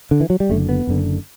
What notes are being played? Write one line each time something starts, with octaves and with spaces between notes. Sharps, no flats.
D3
E3
F#3
G3
F#1 F#2 D3 A3
B3
F#1 F#2 D3